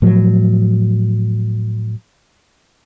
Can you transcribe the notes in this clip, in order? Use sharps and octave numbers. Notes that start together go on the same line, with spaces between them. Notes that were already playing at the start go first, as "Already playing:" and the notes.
A2 F3 F#3